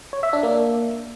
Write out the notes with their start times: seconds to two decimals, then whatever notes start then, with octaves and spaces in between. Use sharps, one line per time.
0.13 C#5
0.23 E5
0.33 D4
0.43 A#3